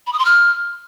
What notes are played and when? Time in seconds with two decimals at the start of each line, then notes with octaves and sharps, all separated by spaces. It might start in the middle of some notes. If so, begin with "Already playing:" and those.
0.07 B5
0.13 D#6
0.19 C6
0.25 F6